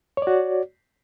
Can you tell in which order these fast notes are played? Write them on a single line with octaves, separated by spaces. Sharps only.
C#5 D5 F#4